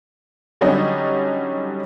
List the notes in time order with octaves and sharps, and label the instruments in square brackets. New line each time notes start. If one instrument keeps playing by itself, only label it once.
[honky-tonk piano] D3 F#3 G3 C#4 D#4